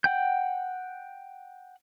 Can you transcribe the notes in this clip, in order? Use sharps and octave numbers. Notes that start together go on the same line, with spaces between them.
F#5 G5 G6